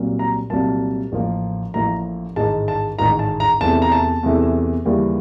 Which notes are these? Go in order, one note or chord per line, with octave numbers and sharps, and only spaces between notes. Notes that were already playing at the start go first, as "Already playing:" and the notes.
Already playing: C2 A#2 F#3 A#3
A#5
C2 A#2 F#3 A#3 A5
A1 A2 F3 A#3
A1 A2 F3 A#3 A#5
A1 G#2 D#3 G#3 A5
A5
A1 G#2 D#3 G#3 A#5
A5
A#5
E2 C3 E3 A3 A5
A#5
A5
E2 C3 E3 A3
D#2 C#3 E3 G3 A#3